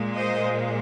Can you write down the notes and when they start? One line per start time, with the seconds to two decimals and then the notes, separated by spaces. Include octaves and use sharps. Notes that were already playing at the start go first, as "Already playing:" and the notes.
Already playing: A#2 G#3
0.14 C5 D#5